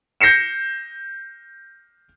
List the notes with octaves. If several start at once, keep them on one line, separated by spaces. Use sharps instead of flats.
G6 A#6 C7 C#7 E7